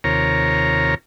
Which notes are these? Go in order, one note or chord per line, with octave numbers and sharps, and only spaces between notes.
D#2 C3 F4 A#4 C#5 A#5